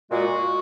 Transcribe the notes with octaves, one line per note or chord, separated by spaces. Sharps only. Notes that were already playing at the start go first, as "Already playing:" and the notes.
A#2 G#3 F#4